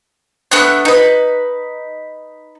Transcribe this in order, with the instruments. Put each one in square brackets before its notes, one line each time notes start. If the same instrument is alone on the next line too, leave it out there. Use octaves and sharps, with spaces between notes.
[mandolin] A3 B3 D4 F#6
D#4 B4